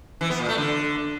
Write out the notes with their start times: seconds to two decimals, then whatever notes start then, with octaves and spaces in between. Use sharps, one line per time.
0.21 E3
0.30 B3
0.39 A#2
0.49 A3
0.58 D3